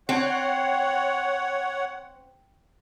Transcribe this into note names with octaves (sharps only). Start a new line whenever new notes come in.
C4 C#5 F#5